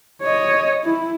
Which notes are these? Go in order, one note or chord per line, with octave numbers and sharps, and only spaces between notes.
C#5 D#5
E4